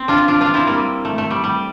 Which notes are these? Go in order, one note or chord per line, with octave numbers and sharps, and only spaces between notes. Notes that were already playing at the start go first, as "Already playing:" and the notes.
Already playing: C4
D4 F4
D4 F4
D4 F4
C4 E4
G3 A#3
A3
A3
G3
G3